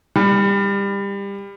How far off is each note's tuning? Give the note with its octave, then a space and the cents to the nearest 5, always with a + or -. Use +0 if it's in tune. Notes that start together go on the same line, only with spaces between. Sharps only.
G3 +25